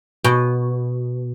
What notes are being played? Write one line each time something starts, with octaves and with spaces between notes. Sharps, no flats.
B2